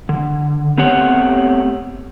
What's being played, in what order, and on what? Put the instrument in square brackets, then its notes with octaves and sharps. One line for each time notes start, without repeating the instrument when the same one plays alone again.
[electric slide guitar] D3
A3 B3 C4 G4 C#5 F#5